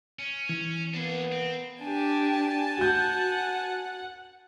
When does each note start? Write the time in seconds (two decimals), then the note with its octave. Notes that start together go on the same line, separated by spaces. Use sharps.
0.19 C#4
0.49 E3 C#4
0.94 A#3 B3 D4 G#4
1.32 C4
1.83 D4 G4 G#5 A5
2.78 F#4 F#5 G6